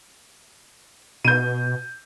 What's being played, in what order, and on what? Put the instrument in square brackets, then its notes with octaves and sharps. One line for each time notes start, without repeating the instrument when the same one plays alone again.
[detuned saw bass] B2 [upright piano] G6 D#7